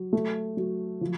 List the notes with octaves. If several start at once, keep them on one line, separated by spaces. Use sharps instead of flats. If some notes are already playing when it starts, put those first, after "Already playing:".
Already playing: F#3
A3
F#3
F3